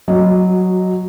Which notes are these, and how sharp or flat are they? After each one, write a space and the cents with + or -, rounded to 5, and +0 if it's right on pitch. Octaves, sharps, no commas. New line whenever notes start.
F#3 +0 F#4 -25 D#5 +0